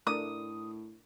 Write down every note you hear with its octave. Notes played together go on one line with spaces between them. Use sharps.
A2 A3 D4 A#4 D#6